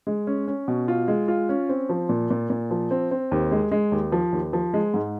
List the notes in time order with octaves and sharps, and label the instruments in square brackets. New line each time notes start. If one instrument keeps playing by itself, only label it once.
[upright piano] G#3
C#4
C#4
B2
F4
G#3
F4
C#4
C4
F3
A#2
A#2
A#2
F3
C4
C4
D#2
G#3
G#3
D#2
F3
D#2
F3
G#3
G#2